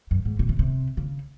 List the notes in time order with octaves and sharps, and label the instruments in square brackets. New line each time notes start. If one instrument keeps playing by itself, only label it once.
[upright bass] F#2
G#2
B2
C3
C3
C#3